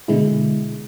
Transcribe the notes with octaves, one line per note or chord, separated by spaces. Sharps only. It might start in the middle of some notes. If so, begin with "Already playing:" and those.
B2 D3 G#3 E4